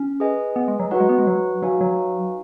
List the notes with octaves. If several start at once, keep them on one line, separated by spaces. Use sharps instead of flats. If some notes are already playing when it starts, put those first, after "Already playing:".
Already playing: C#4
G#4 B4 D#5 G#5
B3
G#3
F#3
F#3 D#4 F#4 B4 F#5
G#3
B3
G#3
F#3
F#3 D#4 F#4 B4 F5 G#5
F#3